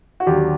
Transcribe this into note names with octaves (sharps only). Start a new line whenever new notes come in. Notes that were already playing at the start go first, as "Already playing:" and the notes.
F#4
D#2 D3 F#3 G4